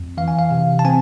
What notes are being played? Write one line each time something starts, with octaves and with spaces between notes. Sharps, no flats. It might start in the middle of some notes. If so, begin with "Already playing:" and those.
Already playing: F2
E3 F5
G#5
F5
C3
A5
C4 G#5